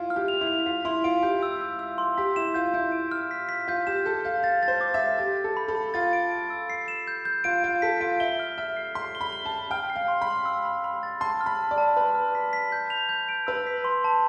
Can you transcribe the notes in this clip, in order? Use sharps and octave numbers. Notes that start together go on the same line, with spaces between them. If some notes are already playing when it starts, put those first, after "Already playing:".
Already playing: E4 F4
F6
G4
F7
E4
F7
F4 B6
E4 C6
F4 D7
G4 G6
E6
E6
E6
C6
G4 B6
E4 E7
F4 G6
E4 G6
D7
F6
B6
B6
F4 G6
G4 E7
A4 G6
F5 G6
F5 A6
A6
C5
D6
E5
A6
G4 A6
A6
A4
B5
A4
B5
F4 A6
D7
D7
E6
C7
E7
G6
G6
F4 D7
F4 D7
A4 B6
F4 D7
E5 G7
F6
E5 F6
C7
C6 B6
G7
B5
G7
A5
G7
G5 F6
C7
F5
C6
B5
C6
E6
B5
B5
A6
A5 C6
F6
B5
A5
D5
A5
B4 B5
F6
B6
B6
G6
F7
G6
D7
B4 E6
B6
C6
A5